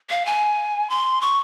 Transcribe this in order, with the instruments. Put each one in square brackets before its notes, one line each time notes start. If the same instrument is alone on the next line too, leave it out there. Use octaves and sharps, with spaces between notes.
[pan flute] F5
G#5
C6
C#6